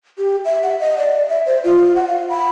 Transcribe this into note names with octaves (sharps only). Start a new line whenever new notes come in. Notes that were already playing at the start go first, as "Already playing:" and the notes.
G4
E5
F#5
D#5
D5
E5
C5
F4
F#5
F5
B5